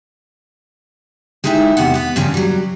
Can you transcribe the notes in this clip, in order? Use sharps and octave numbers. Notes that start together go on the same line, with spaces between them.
G#3 D#4 E4 G4 E5
E2 C3 B3 F#4 F#5
B3 B4
G2 C#3 F3 C#4 F4
F#3 G3